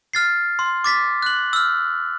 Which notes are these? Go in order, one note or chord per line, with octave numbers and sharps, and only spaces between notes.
F6 A6 C7
C6
D6 A6 B6
F#6 F#7
E6 F6